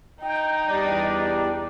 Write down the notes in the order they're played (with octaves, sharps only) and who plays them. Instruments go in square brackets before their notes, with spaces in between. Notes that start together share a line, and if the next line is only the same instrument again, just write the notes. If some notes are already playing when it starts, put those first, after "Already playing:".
[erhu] D#4 [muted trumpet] G5
[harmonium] E2 G3 D5 [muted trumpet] D4